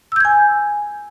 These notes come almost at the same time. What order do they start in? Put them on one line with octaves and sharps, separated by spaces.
E6 G6 G#6 G#5